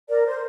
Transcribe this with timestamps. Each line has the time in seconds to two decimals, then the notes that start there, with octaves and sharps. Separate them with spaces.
0.08 A#4 D5
0.26 C5